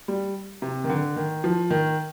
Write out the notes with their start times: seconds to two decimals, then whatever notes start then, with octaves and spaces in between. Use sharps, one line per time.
0.08 G3
0.62 C3
0.84 D#3
0.89 D3
1.16 D#3
1.44 F3
1.70 D#3